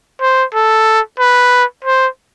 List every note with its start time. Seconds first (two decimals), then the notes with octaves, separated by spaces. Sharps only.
0.21 C5
0.54 A4
1.19 B4
1.84 C5